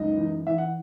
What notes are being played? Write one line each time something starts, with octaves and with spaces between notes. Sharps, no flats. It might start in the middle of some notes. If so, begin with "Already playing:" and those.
Already playing: C#2 F#2 D#4 D#5
E3
E3 E5
F#5